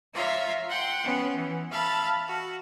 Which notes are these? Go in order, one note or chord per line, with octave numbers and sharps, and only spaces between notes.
F4 C#5 E5 F5 A#5
F#5 G5 C6
B3 C#4
E3
E5 F5 A5 B5
F#4